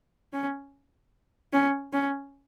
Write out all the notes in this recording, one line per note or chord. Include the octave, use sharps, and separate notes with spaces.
C#4
C#4
C#4